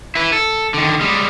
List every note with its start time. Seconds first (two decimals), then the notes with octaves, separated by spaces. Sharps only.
0.15 E4 B4
0.33 A4
0.74 D3 D#3
1.01 G3 G#3